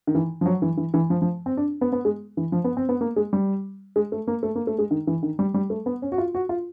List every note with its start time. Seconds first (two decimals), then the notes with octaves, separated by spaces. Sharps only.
0.07 D#3
0.15 E3
0.41 F3
0.46 F#3
0.62 E3
0.77 E3
0.94 E3
1.10 F3
1.22 F3
1.46 C4
1.57 D4
1.81 B3
1.93 B3
2.05 G#3
2.37 E3
2.52 F3
2.64 B3
2.77 C4
2.89 B3
3.01 A#3
3.16 G#3
3.33 G3
3.96 G#3
4.12 A3
4.27 A#3
4.43 A3
4.55 A#3
4.67 A3
4.78 G#3
4.91 D#3
5.07 E3
5.23 D#3
5.39 G3
5.54 G3
5.70 A3
5.86 B3
6.02 C#4
6.12 F#4
6.18 F4
6.35 F#4
6.49 F4